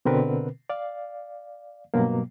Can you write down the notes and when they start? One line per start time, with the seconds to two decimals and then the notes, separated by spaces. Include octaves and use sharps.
0.05 B2 D3 C4 A#4 B4
0.70 D5 F5
1.94 G2 B2 F#3 A#3